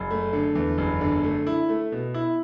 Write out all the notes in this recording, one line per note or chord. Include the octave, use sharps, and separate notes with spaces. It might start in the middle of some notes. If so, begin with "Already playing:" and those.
Already playing: F#1
A3
D3
E2
F#1
D3
A3
E4
A3
B2
E4